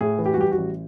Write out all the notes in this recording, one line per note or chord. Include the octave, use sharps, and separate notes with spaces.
A2 G#4
E3
G4
F#4
G3 G4
F#4
A1